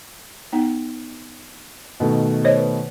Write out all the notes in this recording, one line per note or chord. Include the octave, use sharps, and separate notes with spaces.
B3 D#4 G5
B2 D#3 A3
C5 C#5 D#5
B4